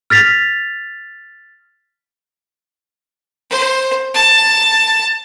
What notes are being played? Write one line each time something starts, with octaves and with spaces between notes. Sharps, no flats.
F6 A6 B6 F7
C5
A5